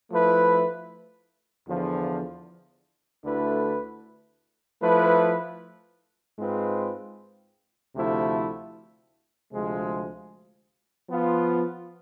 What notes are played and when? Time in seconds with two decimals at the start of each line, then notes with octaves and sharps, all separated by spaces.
0.10 F3 A3 E4 B4
1.67 E2 D3 F3
3.24 D2 D3 A3 E4 B4
4.81 F3 A3 E4 B4
6.38 G#2 G#3 C4 F4 B4
7.95 D2 C3 F3 A3 E4
9.52 D2 C3 F3 G#3
11.09 F3 B3 F4